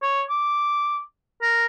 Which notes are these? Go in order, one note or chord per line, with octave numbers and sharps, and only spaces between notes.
C#5
D6
A#4